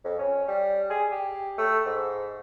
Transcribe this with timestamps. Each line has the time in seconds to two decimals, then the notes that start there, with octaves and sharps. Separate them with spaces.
0.04 F2
0.19 C#4
0.48 G3
0.90 G#4
1.12 G4
1.58 A3
1.86 G#2